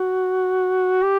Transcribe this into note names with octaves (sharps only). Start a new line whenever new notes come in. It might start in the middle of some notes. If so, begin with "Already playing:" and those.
Already playing: F#4
G4